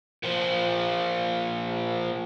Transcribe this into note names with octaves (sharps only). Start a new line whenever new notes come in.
A#2 F3